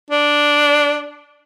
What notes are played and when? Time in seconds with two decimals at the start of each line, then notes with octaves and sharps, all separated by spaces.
0.11 D4